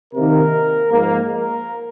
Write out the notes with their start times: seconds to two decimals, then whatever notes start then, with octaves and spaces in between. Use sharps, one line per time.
0.13 C3 D#3 A#3 A#4
0.91 G#2 F3 A#3
1.31 A#4